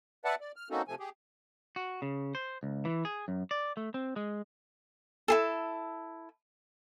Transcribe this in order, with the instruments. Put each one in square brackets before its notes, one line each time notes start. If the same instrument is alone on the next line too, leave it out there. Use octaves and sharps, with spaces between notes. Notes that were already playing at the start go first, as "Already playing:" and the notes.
[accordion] B4 D5 E5 F#5 A5
D5
F6
A#3 C4 C#4 D#4 F#4 A4
C3 F3 A3 G#5
G4 G#4
[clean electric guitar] F#4
C#3
C5
C#2
E3
G#4
F#2
D5
A3
C4
G#3
[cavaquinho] E4 G#4 A4